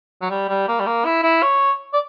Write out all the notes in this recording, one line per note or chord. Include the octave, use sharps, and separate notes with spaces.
F#3
G3
G3
A#3
G3
A#3
E4
E4
C#5
D5